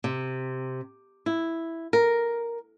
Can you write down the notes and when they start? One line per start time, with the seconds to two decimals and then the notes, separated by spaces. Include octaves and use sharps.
0.04 C3
1.26 E4
1.93 A#4